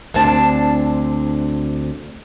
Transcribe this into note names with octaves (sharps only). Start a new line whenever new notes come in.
D2 C4 D4 A5